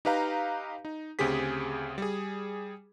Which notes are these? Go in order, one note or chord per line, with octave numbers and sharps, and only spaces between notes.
D#4 G4 B4 F5 A#5
D#4
D2 C#3 C4 G4 G#4 B6
G3 G#4